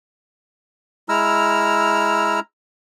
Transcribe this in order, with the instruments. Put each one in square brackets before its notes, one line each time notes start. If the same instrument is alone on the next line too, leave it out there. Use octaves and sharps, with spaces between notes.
[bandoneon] G#3 E4 A#5 E6 F6